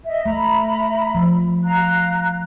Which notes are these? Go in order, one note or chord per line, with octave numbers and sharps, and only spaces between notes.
D#5 E5
A3 E5 A#5 B5
F3
F5 A#5 F#6